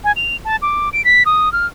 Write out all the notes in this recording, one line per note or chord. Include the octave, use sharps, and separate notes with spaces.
G#5
F7
A5
D6
D7
B6
D#6
F6